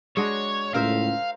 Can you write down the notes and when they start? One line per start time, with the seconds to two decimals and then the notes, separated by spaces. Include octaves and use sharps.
0.17 G#3 D4 F#4 C#5
0.74 C#2 A2 A#4 C5 E5 F5